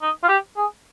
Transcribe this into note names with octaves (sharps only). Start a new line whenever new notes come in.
D#4
F4
G4
G#4